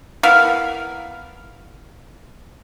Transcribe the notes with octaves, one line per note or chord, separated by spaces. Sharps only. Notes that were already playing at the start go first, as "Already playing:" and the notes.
B3 E4 A#4 F5